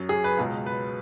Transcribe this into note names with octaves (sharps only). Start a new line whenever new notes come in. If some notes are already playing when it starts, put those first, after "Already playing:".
Already playing: F#2 F#3
G#4
B4
C#2 B2 G#3
B4